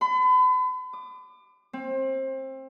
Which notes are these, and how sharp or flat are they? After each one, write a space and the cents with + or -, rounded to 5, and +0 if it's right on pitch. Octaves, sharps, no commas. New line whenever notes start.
B5 +40
D6 +35
C4 +25